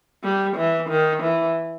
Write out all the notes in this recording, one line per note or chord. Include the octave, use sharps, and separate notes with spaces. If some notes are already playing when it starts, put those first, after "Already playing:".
G3
E3
D#3
E3